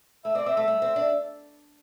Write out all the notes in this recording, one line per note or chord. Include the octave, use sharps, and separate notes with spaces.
A3 E5
C4 D5
C4 E5
A3 E5
G3
C4
D4